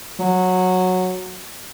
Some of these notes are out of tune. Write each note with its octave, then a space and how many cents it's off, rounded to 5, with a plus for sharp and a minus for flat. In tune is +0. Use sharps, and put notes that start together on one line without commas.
F#3 -10